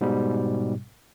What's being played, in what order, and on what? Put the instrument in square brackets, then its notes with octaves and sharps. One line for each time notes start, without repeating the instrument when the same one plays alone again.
[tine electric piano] G#2 B2 G3